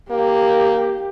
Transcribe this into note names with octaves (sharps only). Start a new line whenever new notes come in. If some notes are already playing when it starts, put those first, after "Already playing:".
A#3 G4